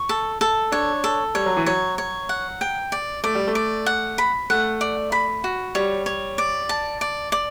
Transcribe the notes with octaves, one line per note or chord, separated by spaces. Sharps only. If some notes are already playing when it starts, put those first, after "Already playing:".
Already playing: C#6
A4
A4
D4 C#5
A4
G3 C#5
F#3
E3
F#3 C#5
C#5
F#5
G5
D5
A3 D5
G3
A3
D5
F#5
B5
A3 F#5
D5
B5
F#4
G3 C#5
C#5
D5
A5
D5
D5